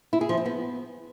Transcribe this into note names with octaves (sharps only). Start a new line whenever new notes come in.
E4
G#4
F3
C4
B3